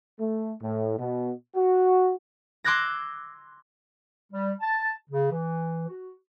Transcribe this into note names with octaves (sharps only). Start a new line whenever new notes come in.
A3
A2
B2
F#4
C6 D6 E6 F#6 G#6 A#6
G3
A5
C#3
E3
F#4